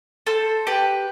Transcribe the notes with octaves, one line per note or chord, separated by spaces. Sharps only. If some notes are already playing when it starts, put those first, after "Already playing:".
A4 C5
G4 B4